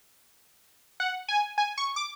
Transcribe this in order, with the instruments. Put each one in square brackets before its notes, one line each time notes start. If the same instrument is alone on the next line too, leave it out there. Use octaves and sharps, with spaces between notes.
[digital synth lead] F#5
G#5
G#5
C#6
D6